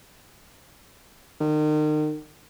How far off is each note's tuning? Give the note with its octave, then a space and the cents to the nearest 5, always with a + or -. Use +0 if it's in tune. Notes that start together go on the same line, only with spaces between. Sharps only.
D#3 -35